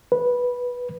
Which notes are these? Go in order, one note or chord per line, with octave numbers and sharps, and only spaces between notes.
B4